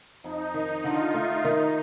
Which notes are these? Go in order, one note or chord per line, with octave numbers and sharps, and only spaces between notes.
F2 D#4
D#3
D3 F4
A3
D#3 D#4